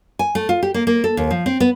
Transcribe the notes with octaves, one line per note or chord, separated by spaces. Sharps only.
G#5
A3
F4
G4
A#3
A#3
A4
D#2
F3
C4
B3